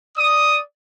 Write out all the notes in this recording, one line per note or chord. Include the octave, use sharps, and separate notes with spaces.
D5 D#6